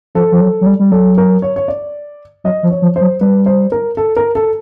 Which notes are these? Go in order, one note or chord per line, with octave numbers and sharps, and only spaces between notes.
F3 A4
F3
F#3
F#3
G3
G3
F#3 A4
A#4
C#5
C#5
D5
F#3 D#5
F3
C#5
F3
C5
F#3
G3 B4
C5
A#4
A4
A#4
A4